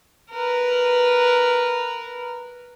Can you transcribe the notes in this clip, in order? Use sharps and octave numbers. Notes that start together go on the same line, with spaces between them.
A#4 B4